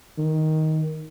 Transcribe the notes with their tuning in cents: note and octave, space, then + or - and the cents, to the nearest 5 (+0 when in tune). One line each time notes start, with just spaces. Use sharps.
D#3 +10